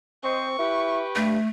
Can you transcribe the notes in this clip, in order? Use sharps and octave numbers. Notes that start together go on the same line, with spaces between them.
C4 C5 D#5 C#6
E4 G4 B4
G2 A3